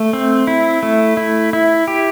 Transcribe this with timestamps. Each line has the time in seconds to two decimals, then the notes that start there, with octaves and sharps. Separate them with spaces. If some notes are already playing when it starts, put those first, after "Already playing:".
Already playing: A3
0.13 C4
0.47 E4
0.83 A3
1.17 E4
1.53 E4
1.88 G4